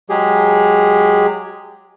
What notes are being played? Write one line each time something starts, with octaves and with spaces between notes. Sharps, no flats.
F#3 G#3 G4 G#4